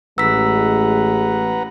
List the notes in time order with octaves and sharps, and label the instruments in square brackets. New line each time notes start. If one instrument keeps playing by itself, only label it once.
[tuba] A1 [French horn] G#3 [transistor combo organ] B4 F#5 A#5 [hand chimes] E6 B6